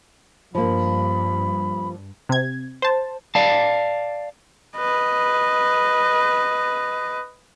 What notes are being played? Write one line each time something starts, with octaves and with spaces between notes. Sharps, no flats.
G2 F3 A#3 B5
C3 G#6
C5 A5
D5 F5 A5
B4 D#5